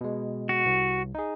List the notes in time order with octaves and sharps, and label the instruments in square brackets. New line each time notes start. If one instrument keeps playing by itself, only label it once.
[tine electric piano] B2 G#3
[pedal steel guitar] F#4
[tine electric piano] C2
D#4 G#4